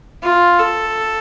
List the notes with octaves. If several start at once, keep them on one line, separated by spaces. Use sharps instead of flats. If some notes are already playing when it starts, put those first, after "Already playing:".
F4
A4